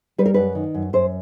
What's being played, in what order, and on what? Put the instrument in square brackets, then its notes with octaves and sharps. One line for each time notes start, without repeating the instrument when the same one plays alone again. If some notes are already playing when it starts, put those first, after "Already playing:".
[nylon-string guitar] G3 B4
A#4
F#2 B4
D#3
F#2
F#2 C5